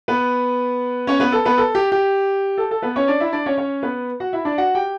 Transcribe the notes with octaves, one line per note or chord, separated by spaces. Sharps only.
B3 B4
C#4 C#5
B3 B4
A4
B3 B4
A4
G4
G4
A4
A4
B3 B4
C#4 C#5
D4 D5
E4 E5
D4 D5
C#4 C#5
C#4 C#5
B3 B4
F#4 F#5
E4 E5
D4 D5
F#4 F#5
G4 G5